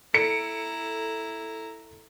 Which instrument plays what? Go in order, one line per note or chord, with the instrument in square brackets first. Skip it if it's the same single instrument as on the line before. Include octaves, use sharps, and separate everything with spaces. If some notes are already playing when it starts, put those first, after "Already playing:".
[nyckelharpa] E4 A#5 [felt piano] A4 C#7 D7